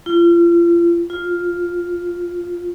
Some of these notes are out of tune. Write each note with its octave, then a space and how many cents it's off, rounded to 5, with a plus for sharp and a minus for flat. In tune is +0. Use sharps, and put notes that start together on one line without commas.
F4 -35
F4 +5